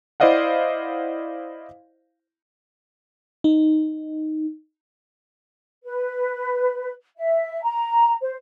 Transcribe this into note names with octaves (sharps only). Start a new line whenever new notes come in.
E4 C5 D5 D#5 F5 F#5
D#4
B4
E5
A#5
C5